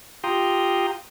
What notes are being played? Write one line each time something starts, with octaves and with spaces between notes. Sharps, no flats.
F4 G4 G5 A#5 C6 D#6